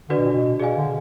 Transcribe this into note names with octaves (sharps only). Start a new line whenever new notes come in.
D3 D4 F#4 B4 D5
B2
A#2
B2
B2 G#4 D5 F5 G#5
D3